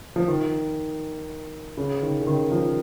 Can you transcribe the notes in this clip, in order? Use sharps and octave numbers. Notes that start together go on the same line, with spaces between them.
F3
D#3
C#3
D#3
C#3
D#3
F3